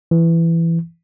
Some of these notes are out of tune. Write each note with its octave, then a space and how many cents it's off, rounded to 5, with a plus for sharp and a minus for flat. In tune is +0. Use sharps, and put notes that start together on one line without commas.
E3 +15